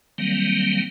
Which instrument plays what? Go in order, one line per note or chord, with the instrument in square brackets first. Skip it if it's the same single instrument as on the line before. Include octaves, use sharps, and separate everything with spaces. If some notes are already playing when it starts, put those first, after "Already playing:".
[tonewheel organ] D#3 F#3 G3 A#3 C4